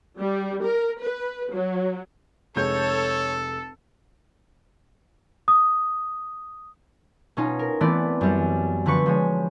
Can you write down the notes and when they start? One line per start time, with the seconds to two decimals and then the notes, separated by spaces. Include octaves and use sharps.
0.20 G3
0.62 A#4
1.03 B4
1.52 F#3
2.56 F1 G#3 A4 C#5 G6
5.48 D#6
7.37 B2 C#4 D#4 F4
7.59 A#4
7.81 E3 A3 B3 C4 E4 D5
8.21 F#2 G3
8.86 D3 F3 B4 C#6 C#7
9.06 F3 G#3 C#5